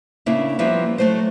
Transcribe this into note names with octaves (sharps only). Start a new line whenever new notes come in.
C#3 A#3 D4 E4
F3 G3 A#3 B3 E4
F#3 A3 C5